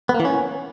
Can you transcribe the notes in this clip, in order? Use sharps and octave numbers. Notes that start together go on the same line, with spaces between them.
B3
A#3
E3
C#4